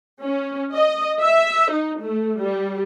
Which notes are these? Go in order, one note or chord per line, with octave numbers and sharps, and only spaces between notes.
C#4
D#5
E5
D#4
A3
G3